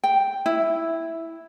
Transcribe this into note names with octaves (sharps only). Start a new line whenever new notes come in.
G5
E4